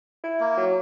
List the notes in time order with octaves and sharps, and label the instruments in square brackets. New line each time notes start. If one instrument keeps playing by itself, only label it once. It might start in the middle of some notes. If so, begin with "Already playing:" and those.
[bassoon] E4
[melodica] A#3
[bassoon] F#3